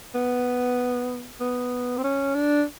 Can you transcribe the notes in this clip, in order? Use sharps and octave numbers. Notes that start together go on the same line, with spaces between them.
B3
B3
C4
C#4
D4